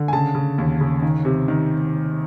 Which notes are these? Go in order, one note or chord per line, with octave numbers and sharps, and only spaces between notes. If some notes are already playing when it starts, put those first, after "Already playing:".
Already playing: D3
G#5
C#3 A5
C#3
D#2
C#3
D#3
C3
D#3